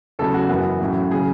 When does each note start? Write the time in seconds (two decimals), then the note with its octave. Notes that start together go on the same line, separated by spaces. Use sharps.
0.19 E2 C#3 F#3 A3 A4
0.34 F#4
0.49 F#2 E3 B3 F#4
0.80 A1 A2 F#3 C#4
1.11 C#3 F#3 G#4